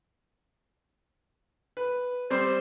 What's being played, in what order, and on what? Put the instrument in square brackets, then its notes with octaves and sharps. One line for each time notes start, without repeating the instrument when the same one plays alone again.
[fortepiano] B4
[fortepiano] G3 C4 [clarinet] C5